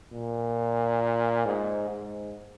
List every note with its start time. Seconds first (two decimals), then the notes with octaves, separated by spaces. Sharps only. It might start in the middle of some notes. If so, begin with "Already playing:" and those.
0.12 A#2
1.45 G#2
1.89 G#2